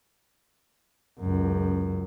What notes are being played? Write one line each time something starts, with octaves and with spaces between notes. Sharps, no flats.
C#2 F#2